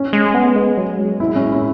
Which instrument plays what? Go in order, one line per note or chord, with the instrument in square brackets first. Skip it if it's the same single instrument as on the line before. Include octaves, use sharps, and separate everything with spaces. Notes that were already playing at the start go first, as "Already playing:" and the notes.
Already playing: [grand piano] C#4
[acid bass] G#3
B3
G#3
F#3
G#3
[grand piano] E4
C#4
E4